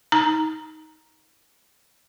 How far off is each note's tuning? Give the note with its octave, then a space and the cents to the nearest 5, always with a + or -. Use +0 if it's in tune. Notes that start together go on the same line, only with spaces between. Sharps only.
D#4 +20 A#5 +5